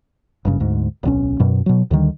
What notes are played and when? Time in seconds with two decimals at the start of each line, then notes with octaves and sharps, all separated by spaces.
0.45 F#1 G2 C#3
0.60 D2 G#2
1.03 D1 B1 C#4
1.40 F#2 B2
1.66 B2 F#3
1.91 D2 D3 D#3 G3